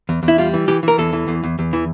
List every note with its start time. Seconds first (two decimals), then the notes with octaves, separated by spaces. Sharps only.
0.09 E2
0.23 E2
0.28 E4
0.38 G3 F4
0.54 E3
0.68 E3 G4
0.83 E3
0.88 A#4
0.98 E2 A4
1.13 E3
1.28 E2
1.43 E2
1.59 E2
1.73 E3